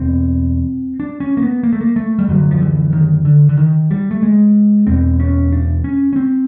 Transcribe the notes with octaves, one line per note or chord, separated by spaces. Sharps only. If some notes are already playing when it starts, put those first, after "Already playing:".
Already playing: E2 B2 C4
D4
C#4
A#3
B3
A#3
A3
A#3
A3
G3
F#2 D3 F#3
F3
E3
D#3
D3
D3
D#3
G3
A3
G#3
E2 B2 C4
C#4
D4
C#4
C#4
C4